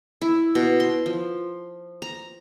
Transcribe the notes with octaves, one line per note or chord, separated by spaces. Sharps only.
E4
B2
C6
F3
A#5